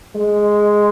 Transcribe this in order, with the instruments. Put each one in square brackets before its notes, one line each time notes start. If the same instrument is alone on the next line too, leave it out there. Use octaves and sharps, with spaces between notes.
[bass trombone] G#3